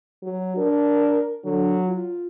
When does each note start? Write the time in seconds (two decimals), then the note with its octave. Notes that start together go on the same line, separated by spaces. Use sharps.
0.23 F#3
0.57 D4 A#4
1.45 D3 F#3
1.88 F4